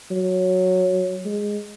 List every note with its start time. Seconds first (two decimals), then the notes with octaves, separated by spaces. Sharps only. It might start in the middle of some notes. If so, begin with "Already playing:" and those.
0.11 F#3
1.25 G#3